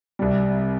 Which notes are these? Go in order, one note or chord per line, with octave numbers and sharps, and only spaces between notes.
C2 C3 G3